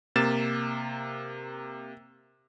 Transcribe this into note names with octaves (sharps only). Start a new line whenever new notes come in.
C3 A#3 A6 E7